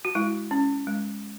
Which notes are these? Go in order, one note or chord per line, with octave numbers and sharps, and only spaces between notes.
F#4
G#3 E4
C#4
G#3